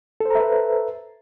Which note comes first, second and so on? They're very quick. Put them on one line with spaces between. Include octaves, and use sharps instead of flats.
A4 C5 A#5 E5 B4